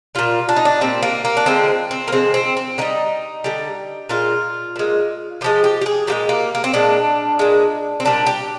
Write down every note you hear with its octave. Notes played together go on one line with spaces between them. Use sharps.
A#2 G3 F4
D4
D#4
D4
A#2 G3 C4
A#3
A#3
D4
D3 F3 G#3 C4
C4
A#3
D3 F3 G#3 C4
C4
C4
D3 G3 D#4
D3 G3
A#2 G#3 F4
A#2 G#3
A#2 F3 G#3 G4
G4
G4
G#4
A#2 F3 G#3 G4
A#3
A#3
C4
A#2 G#3 D4
A#2 G#3
C4
A#2 G3 D4
G4